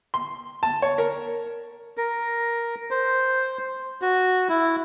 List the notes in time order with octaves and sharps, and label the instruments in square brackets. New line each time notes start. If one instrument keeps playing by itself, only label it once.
[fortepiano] C6
A5
C#5
A#4
[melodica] A#4
C5
F#4
E4